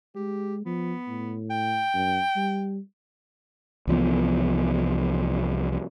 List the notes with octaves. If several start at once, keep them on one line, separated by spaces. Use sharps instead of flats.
G#3 G4
F3 B3
A2
G5
F#2
G3
C2 E3 F3 B3